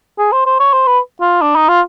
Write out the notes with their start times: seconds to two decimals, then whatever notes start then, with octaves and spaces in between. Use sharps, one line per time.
0.19 G#4
0.32 C5
0.46 C5
0.60 C#5
0.73 C5
0.87 B4
1.21 F4
1.42 D4
1.56 D#4
1.69 F4